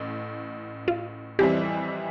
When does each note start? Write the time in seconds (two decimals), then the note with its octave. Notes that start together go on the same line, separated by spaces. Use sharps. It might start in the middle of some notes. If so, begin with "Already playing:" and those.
Already playing: A1 A2
0.88 F4
1.39 F2 E3 G3 C4 E4 G4